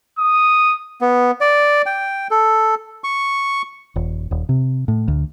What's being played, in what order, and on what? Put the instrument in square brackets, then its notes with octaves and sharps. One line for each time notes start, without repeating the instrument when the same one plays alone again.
[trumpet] D#6
[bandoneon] B3
D5
G5
A4
C#6
[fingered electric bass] D#1
D#1
C3
A2
D2